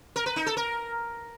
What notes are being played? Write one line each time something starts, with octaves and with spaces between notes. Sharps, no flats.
A#4
B4
D#4
A4
A#4